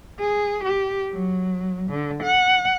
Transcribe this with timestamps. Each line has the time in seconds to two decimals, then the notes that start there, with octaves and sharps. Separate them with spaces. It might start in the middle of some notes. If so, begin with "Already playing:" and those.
0.19 G#4
0.64 G4
1.13 F#3
1.90 D3
2.22 F#5